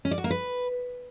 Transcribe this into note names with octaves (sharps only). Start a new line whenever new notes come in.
C#4
D5
F#4
A#3
B4